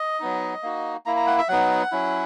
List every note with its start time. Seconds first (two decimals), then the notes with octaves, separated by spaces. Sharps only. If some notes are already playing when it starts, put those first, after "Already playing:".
Already playing: D#5
0.20 F#3 B3 D#4
0.63 A#3 D#4 F#4
1.06 A#3 E4 A#5
1.16 A#5
1.27 F#5
1.38 E5
1.49 F#3 B3 D#4 F#5
1.92 F#3 C#4 E4